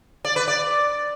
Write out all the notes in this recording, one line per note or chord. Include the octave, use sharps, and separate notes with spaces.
D5
B4
D5